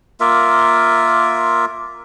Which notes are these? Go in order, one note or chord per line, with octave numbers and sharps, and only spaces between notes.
A#3 F4 A#4 E5